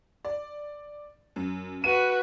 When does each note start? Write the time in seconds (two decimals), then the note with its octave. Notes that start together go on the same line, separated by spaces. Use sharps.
0.25 D5
1.36 F#2
1.84 F#4 B4 D#7